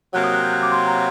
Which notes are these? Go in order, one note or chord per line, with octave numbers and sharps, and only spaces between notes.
C3 F#3 A#3 F#6
D#6
F#6
G6
F#6
D6
C6
A#5